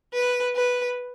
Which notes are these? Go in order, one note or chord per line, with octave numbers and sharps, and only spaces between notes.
B4
B4